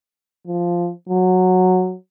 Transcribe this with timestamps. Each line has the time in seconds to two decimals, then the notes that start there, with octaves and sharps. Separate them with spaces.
0.47 F3
1.09 F#3